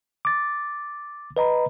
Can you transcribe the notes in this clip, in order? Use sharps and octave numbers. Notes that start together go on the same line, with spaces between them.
D6 A6
B4 D#5 A#5 B5